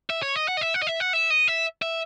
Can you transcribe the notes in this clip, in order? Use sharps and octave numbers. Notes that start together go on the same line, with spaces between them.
E5
C#5
D#5
F#5
D#5
E5
F#5
D#5
E5
F#5
E5
D#5
E5
E5